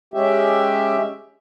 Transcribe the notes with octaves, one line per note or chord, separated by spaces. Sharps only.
G#3 C#4 G4 E5